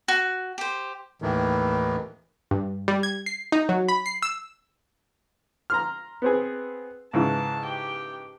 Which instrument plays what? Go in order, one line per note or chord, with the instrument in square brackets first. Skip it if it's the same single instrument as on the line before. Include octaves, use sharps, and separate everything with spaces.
[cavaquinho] F#4
G4 C5
[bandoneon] D#2 A2 D#3 E3
[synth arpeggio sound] G2
G3
G#6
C7
D#4
F#3
B5
C7
E6
[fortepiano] A#5 C6 F6
B3 C4 G#4
[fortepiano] G#2 C#3 E3 [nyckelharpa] A5
[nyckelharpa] G4 G5